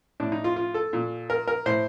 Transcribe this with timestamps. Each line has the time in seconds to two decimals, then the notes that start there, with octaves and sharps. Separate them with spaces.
0.20 A2 D4
0.32 D#4
0.44 F4
0.56 F4
0.74 A4
0.93 A#2
1.30 A#4
1.47 A#4
1.66 A2 C5